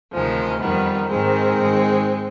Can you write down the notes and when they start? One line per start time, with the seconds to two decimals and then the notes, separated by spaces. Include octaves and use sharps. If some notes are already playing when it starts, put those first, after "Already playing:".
0.12 D2 C3 D#3 F3 G#3
0.60 F2 D#3 G3 B3
1.08 G#2 D#3 G#3 C4
1.56 G#2 D#3